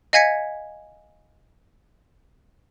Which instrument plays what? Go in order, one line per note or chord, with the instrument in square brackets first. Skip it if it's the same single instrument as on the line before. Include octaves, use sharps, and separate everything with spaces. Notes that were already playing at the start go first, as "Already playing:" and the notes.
[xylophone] D#5 F5 G#5 G#6 B6 C#7